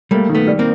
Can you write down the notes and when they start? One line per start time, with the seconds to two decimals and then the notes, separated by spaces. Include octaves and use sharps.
0.11 G3 A3 A#3
0.29 D#3
0.35 A3 B3
0.47 G3
0.59 A#3 C4